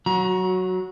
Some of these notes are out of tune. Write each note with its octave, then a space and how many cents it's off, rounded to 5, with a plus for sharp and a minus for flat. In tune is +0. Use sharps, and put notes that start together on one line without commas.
F#3 +0 F#4 -20 A#5 +30